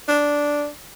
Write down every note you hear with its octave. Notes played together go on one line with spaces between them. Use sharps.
D4